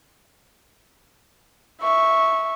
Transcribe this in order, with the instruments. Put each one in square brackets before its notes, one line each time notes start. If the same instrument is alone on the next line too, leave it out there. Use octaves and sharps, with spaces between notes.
[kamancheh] E5 C#6